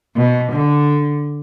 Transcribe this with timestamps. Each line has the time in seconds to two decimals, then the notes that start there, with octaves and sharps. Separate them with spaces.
0.16 B2
0.52 D3